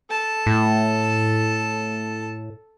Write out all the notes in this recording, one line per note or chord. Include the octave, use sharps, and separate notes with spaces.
A4 A5
A2